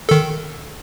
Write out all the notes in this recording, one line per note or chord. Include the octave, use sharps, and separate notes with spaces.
D#3 A4